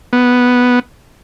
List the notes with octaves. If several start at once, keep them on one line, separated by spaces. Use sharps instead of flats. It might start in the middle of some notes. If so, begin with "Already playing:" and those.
B3